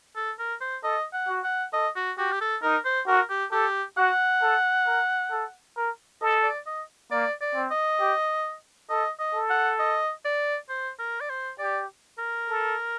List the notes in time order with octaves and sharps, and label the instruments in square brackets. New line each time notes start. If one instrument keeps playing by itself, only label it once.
[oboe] A4
A#4
C5
[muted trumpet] A4 [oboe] D#5
[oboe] F#5
[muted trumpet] F#4
[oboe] F#5
[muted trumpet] A4 [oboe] D#5
[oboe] F#4
[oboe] F#4 [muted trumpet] G4
[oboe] G4
A4
[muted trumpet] D#4 [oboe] A#4
[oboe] C5
[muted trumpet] F#4 [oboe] A#4
[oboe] G4
[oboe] G4 [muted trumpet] A4
[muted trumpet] F#4 [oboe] F#5
[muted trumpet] A4
A#4
A4
A#4
[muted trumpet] A4 [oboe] D#5
[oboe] D5
D#5
[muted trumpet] A#3 [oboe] D5
[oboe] D5
[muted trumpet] C4
[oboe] D#5
[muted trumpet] G4
[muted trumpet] A4 [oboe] D#5
[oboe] D#5
[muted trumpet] A4
[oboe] F#5
D#5
D5
C5
A#4
D5
C5
[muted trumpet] G4 [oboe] D5
[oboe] A#4
[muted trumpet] A4